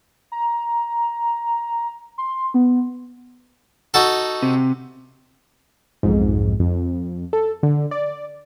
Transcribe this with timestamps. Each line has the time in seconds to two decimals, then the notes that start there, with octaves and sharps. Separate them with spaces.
0.32 A#5
2.18 C6
2.54 B3
3.94 D#4 F#4 A4
4.42 C3
6.03 B1 F2 G#2
6.60 F2
7.33 A4
7.63 D3
7.91 D5